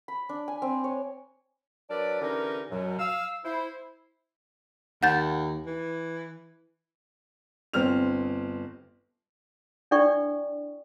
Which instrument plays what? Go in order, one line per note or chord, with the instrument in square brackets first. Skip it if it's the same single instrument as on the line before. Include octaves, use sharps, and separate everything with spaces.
[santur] B5
D4
G#5
C4
C#5
[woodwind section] F#3 D4 A#4 B4 D5
D3 E3 C#4 D#4 G4 A#4
F#2 B2 F#3
F5 E6
E4 C5
[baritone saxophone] D#2 [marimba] F#5 G6 A6
[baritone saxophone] E3
[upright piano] G1 C4 F6 F7
[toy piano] D4 E4 A4 D5 G5 C#6